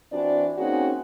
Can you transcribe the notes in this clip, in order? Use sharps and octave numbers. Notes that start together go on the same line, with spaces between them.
E3 C4 D4 F#4 D5
A#3 C4 C#4 D#4 F#4 G#4